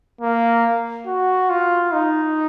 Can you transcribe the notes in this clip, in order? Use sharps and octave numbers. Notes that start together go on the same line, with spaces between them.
A#3
F#4
F4
D#4